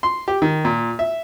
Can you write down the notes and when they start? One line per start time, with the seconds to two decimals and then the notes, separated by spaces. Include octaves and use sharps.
0.03 C6
0.28 G4
0.42 D#3
0.65 A#2
0.99 E5